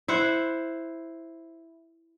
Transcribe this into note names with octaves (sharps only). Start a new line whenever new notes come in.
E4 C5 F#5